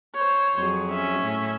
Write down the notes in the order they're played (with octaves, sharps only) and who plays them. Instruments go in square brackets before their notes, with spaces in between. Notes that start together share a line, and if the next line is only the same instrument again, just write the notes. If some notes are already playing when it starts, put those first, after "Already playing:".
[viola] C5 C#5
[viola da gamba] F2 F#3 G#4
[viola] C#4 E5
[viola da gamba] A2